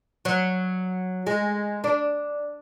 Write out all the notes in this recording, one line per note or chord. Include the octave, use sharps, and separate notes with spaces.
F#3
G#3
D4